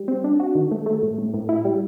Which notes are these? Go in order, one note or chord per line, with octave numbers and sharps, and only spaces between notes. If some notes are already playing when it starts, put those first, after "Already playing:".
Already playing: G3
C4
D4
F#4
D#3
A3
A3
A2
A2
A2
E4
G3